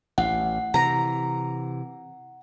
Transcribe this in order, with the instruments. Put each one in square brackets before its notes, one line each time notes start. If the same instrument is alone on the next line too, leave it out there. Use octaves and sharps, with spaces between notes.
[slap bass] A1 [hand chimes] F#5
[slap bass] C3 E3 [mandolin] A#5